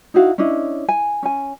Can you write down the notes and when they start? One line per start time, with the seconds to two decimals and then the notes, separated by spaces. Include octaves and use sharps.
0.14 D#4 E4 F#4 F5
0.38 C#4 D4 E4 D#5
0.88 G#5
1.23 C#4 G#5